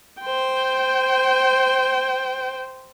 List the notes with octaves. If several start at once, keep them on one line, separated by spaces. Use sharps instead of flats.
C5 G5